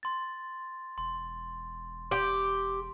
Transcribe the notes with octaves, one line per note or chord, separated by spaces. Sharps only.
C6 A6
E1 C6
G4 C6